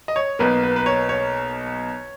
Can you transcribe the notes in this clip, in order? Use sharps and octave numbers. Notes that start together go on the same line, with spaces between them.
D#5
C#5
B1 B2 A#3 B4
B4
B4
C#5
C#5